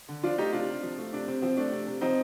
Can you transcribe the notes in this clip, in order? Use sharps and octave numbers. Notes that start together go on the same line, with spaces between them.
D3
F3 D4 F4
A3 D#4 G4
C3 D4 F4
C3
F3
A3
C3 D4
C3 C4
F3 C4
A3 D4
C3
C3
F3 C4 D#4